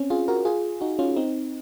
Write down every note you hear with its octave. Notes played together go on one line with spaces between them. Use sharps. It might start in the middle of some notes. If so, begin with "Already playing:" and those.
Already playing: C4 C#4
F4 G#4
F#4 A#4
F4 G#4
D#4 F#4
C#4 F4
C4 D#4